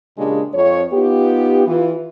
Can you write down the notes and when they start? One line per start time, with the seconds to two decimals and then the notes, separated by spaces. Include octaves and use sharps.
0.18 A#2 C#3 G#3 D4 G4 G#4
0.54 F2 C#5
0.93 B3 D#4 F4 G4
1.67 E3 F4